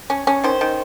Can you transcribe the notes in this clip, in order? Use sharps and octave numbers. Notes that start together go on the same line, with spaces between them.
C#4
C#4
D#3 C5
D#3